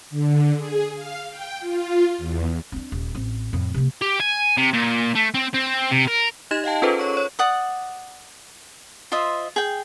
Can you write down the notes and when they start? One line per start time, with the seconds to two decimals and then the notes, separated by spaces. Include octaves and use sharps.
0.10 D3
0.56 G#4
0.95 F5
1.30 G5
1.60 F4
2.18 E2
2.72 C4 D4
2.92 D#1
3.15 A1 C4
3.53 F2 A2
3.74 C3 A#3
4.01 G4
4.20 G#5
4.57 C3
4.73 A#2
5.15 A3
5.34 C4
5.54 C4
5.91 C3
6.07 A#4
6.51 D#4 G4 D#5 G#6 E7
6.64 D#5 F5 G5 A5
6.82 C#4 F4 G#4 A4 B4 C5
6.99 C#5 C#6
7.14 C#5 C#6
7.39 D5 F#5 D#6
9.12 F4 C5 D#5 E5
9.56 G#4 G5